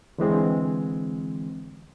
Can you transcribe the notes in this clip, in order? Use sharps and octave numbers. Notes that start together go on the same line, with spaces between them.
D3 E3 G#3 C4